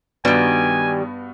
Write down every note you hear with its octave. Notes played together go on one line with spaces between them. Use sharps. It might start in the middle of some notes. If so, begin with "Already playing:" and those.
G2 D#3 G3 B3 F#4 G#5